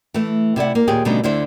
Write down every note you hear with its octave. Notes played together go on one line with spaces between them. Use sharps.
E3 A3
C3 E4 D5 F#5
A#3
D#2 A#2 G4 G#4
B2 D3 G3 A3 C#4 D#4
D2 D3 E4 C5